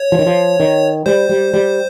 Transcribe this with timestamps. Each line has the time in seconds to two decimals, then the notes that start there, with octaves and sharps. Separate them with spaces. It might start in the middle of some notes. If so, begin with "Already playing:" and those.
Already playing: C#5
0.12 F3
0.19 D#3
0.26 F3
0.60 D#3
1.06 G3 C5
1.29 G3
1.53 G3